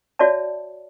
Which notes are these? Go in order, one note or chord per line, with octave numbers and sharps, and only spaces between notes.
F#4 C#5 D5 E5 A5